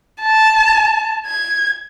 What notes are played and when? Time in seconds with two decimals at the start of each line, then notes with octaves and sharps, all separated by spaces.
0.21 A5
1.27 G#6